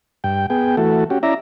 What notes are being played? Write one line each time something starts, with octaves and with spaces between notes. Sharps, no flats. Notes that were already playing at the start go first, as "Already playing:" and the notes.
G2 G5
B3 G#4 G5
E3 A3 F#4 A4
C#4 F#4 G4
C#4 E4 D5 E5 A#5